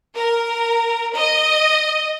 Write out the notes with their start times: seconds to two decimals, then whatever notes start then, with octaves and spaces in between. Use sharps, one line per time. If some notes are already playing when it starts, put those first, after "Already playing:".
0.16 A#4
1.17 D#5